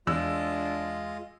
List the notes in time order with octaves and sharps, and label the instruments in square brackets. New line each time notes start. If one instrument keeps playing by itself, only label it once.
[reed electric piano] E2 [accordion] G#3 F4 D#5 [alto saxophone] D4 [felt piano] E6